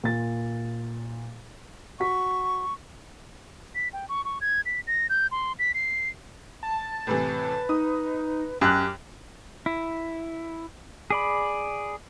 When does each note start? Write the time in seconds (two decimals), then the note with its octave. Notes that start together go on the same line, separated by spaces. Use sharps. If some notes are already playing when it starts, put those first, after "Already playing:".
0.04 A#2 A6
2.00 F#4 C#6 B6
3.75 B6
3.93 G5
4.09 C#6
4.25 C#6
4.41 G#6
4.66 B6
4.87 A#6
5.10 G6
5.31 C6
5.59 B6
5.74 C7
6.63 A5
7.07 A2 C3 E3 B4
7.69 D#4 D#6
8.61 F#2 G4 F6 F#6
9.66 E4
11.10 G#4 D5 B5